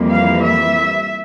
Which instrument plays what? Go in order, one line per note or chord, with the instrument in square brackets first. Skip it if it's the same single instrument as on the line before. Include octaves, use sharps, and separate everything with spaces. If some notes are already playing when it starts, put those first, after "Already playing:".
Already playing: [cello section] F2 E3 G3 A#3
F5
E5